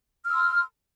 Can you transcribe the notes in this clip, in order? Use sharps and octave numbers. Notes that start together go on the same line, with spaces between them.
C6 E6 F6